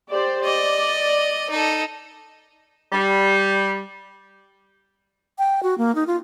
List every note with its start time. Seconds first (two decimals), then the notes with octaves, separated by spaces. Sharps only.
0.11 G4 C5 D5
0.45 D5 D#5
1.50 D#4 A4
2.93 G3
5.38 G5
5.63 F#4
5.78 A#3
5.95 D#4
6.07 F4